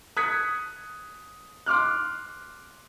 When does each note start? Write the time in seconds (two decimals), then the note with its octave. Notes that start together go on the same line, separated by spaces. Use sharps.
0.17 D#6 F#6 G#6 B6 C#7
1.66 C6 D6 F6 F#6